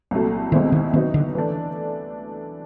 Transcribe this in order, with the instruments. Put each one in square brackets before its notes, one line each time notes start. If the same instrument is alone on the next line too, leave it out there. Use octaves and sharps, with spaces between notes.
[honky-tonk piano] C2 A#2 F#3 A3
[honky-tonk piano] C2 B2 G#3 C4 E4 [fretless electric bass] D#3
[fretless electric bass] D#3
[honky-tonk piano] B2 F#3 B3 D#4 [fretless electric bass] D#3
[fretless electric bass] D3
[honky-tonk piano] E3 A3 D4